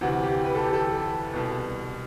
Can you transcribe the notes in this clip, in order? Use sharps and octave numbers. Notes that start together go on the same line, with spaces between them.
D2 C3 E3 F#4
G4
B4
A4
G4
A4
C2 B2